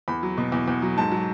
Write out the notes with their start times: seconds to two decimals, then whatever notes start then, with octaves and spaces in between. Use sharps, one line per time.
0.08 E2 B5
0.23 F#3
0.37 B2
0.52 E2
0.68 E2
0.82 F#3
0.97 G#2 A5
1.12 F#3